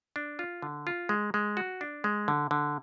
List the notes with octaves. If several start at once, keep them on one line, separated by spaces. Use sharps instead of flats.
D4
F4
D3
F4
G#3
G#3
F#4
D4
G#3
D3
D3